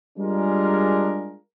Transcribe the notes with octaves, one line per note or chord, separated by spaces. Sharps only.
G3 G#3 D4 F4 G#4 A#4